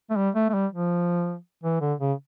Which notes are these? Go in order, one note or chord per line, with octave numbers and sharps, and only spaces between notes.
A3
G3
A3
A3
G3
F3
E3
D3
C#3